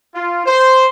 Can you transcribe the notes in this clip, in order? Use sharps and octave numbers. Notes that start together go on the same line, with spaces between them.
F4
C5